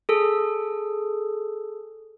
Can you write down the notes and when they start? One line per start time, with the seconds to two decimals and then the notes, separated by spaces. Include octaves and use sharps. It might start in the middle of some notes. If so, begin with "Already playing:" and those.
0.09 G#4 A4